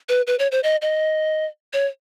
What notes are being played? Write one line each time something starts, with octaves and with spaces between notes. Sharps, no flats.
B4
B4
C#5
C5
D#5
D#5
C#5